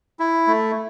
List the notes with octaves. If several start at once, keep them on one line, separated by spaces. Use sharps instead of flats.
E4
A3